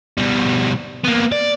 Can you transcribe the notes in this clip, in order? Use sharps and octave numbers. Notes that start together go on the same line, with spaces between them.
B2 G3
A#3 B3
D5